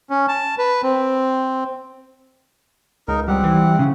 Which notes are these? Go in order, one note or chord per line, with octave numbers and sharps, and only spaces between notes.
C#4
A5
B4
C4
C#2 D#4 A#4
G3 C4 F#5
E3
C#3